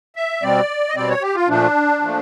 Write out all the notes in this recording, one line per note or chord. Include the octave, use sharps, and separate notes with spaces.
E5
B2 G3 C4 D5
D#5
B2 G3 C4 D5
C#5
G4
F4
A#2 F3 A3 D4
A#2 F3 A3